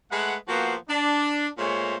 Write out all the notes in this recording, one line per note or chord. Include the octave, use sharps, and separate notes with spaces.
G#3 A3 B4 F#5
F3 A#3 B3 F#4 G4 C5
D4
A#2 G#3 A3 C5 C#5